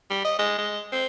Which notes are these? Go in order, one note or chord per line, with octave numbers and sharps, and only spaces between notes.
G3
D#5
G#3
G#3
C4